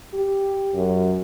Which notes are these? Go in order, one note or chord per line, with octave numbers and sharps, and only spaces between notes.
G4
F#2